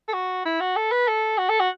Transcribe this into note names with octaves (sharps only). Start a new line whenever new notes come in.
A4
F#4
E4
F#4
A4
B4
A4
F#4
A4
F#4